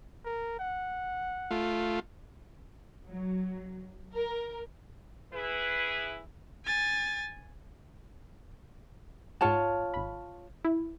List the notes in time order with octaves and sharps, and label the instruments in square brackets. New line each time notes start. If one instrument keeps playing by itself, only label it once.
[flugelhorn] A#4
F#5
[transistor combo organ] A3 F4
[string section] F#3
A#4
[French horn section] E4 G#4 B4
[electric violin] G#5 A6
[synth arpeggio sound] G#2 F#5 [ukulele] F4 C#5 A5
[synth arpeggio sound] G#1 B5
E4